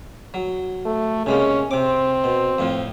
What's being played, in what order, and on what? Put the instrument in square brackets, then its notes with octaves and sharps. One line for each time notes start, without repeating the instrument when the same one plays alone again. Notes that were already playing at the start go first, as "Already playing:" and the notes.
[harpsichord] F#3
[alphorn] A3
[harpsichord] C3 G#3 A#3 [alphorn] C#4
[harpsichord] C3 D6 [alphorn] C4
[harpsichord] B2
F2 A2 F3